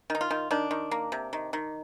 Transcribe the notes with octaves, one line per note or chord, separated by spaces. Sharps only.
D#3 D#4
F4
D#3
D#3 D4
D#3
A#3
C3
D#3
D#3